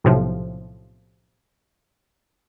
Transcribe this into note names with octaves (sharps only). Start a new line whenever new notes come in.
B1 A2 C3 F3